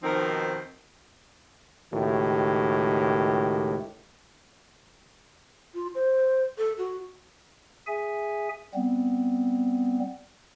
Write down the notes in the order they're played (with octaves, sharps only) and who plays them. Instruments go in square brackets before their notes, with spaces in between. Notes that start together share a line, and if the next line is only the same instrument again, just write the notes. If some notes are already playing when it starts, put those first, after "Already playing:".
[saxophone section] B2 D#3 F3 C4 D#4 A#4
[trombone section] C#2 A2 D#3 F#4 G4
[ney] F4
C5
A4
F#4
[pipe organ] G#4 E5 G#5
G3 B3 C4